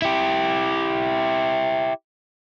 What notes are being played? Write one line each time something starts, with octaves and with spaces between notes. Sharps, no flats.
E4 G4